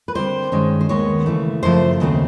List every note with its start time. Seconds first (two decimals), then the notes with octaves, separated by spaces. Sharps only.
0.08 B4
0.15 D3 G3 C4 C5
0.52 G2 D#3 G#3 C#4
0.81 C5
0.89 D#2 D#3 G#3 B3 C#5
1.26 C#3 E3 A3
1.63 F#2 C#3 F3 A3 C5
2.00 D#2 C#3 F#3 A3 C4